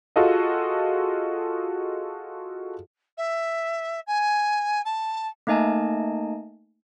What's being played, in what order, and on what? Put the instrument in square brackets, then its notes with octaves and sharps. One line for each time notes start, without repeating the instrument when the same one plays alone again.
[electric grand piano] F4 F#4 G#4 A4 D#5 F5
[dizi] E5
G#5
A5
[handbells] A3 A#3 D#4 D#5 G#5 A5